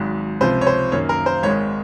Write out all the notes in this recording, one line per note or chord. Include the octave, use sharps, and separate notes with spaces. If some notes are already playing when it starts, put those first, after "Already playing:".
Already playing: G#1 G#2 F#3
C#2 C3 F3 C5
C#5
C5
F#2 D#3 A#3 C#5
A#4
C5
G#1 G#2 D#3 G#3 C#5